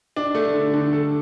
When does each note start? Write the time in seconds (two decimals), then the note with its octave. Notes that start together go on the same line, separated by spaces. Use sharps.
0.16 D4
0.35 A3
0.54 D3
0.73 D3
0.93 A4